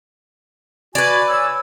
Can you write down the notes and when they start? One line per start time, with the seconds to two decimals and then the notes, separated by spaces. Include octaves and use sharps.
0.95 F#4 B4 D5 G#5
1.30 C#5 G#5 E6